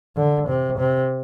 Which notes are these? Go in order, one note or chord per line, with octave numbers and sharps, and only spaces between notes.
D3
C3
C3